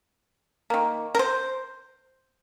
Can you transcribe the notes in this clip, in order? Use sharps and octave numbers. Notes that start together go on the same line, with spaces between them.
D#3 A#3
A#4
C5